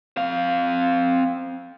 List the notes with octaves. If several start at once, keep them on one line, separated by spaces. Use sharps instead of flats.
C4 F5